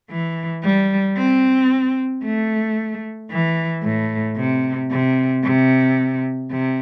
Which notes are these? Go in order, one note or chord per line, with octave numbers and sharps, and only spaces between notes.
E3
G3
C4
A3
E3
A2
C3
C3
C3
C3